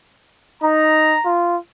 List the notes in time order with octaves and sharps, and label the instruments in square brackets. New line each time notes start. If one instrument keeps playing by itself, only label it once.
[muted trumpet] D#4 [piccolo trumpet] A#5
[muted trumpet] F4